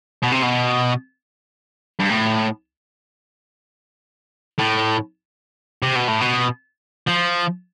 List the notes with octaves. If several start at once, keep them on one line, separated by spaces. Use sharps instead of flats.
B2
C3
B2
G2
A2
A2
C3
B2
A2
B2
F3